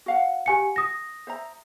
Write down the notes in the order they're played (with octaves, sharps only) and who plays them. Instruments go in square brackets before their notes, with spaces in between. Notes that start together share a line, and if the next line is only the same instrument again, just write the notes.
[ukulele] F#4 F5 F#5
[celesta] G4 G#5 C#7
D#6 A#6
[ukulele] C5 E5 A#5